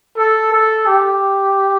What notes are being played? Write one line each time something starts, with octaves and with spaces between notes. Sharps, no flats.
A4
A4
G4